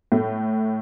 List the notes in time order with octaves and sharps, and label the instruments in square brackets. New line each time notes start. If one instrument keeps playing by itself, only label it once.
[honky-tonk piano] A2 A3